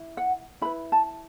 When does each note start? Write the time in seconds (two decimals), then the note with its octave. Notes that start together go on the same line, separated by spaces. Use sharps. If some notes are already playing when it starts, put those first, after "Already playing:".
Already playing: E4
0.17 F#5
0.62 E4 B4 B5
0.92 A5